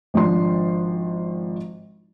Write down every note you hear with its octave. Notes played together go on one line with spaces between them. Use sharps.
G#1 F3 D4 C6